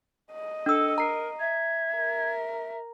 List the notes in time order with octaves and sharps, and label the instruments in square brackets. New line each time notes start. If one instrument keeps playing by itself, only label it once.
[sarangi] D#5
[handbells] D4 E6 [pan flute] A4
[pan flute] A#4 [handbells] A#5 C7
[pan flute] E5 [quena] G#6
[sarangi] A#4